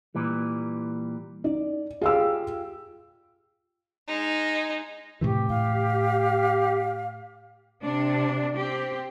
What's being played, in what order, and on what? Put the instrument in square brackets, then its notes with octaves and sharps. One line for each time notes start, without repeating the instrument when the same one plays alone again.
[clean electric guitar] A#2 E3 G3
[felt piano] D#4 [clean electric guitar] D5
[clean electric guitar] F4 G4 [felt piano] G#4 F5 E6
[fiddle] G#3 D#4
[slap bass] A2 C3 E3 [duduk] G4
[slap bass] A2 [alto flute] F5
[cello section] C3 D4
C4 G4